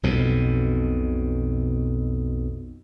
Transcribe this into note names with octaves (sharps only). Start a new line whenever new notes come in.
B1 F2 B2